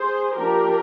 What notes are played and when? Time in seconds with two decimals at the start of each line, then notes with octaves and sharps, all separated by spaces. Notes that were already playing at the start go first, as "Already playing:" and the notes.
Already playing: G#4 C5
0.37 F3 A#3 D4 G4 A#4